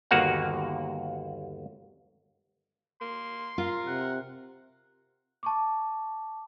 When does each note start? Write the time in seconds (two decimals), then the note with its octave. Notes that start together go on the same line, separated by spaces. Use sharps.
0.11 G1 D#2 A#3 F#4 F5 F#5
3.01 A#3 C6
3.58 F4 A#4
3.87 C3 F#5
5.43 A5 C#6 D6